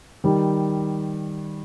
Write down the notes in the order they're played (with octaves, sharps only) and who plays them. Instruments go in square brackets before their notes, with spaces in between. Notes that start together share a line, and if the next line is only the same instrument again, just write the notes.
[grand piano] D#3 G3